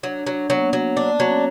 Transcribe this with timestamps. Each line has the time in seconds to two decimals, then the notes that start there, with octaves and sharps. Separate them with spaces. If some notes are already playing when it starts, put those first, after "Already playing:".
0.03 F#3 D4
0.18 D4
0.27 F#3
0.34 D4
0.50 F#3 B3
0.57 A#3
0.64 B3
0.73 F#3
0.96 A#3 D4
1.12 B3
1.20 F#3
1.27 C#4